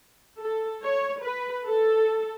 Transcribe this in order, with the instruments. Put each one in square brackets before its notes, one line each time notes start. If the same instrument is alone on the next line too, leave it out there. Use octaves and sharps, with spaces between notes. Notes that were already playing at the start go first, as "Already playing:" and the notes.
[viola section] A4
C#5
B4
A4